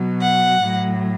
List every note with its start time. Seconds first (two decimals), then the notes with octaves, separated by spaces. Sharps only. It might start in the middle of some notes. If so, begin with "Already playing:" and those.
Already playing: B2 F#3
0.21 F#5
0.61 A2 F#3